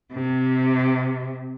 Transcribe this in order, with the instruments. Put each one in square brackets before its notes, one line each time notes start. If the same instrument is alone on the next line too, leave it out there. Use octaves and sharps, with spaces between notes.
[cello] C3